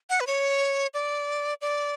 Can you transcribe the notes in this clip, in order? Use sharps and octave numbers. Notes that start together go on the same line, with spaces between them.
F#5
B4
C#5
D5
D5